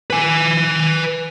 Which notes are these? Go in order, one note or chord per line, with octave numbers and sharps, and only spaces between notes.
B4 G#5